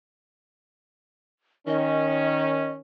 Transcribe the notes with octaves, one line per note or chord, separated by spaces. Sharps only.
D#3 C#4 D#5